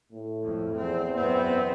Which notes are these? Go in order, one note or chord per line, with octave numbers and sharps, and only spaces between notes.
A2
F2
E2 C4
F#2 B3 C4